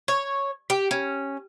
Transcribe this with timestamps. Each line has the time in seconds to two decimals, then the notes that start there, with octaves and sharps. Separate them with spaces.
0.08 C#5
0.70 G4
0.91 C#4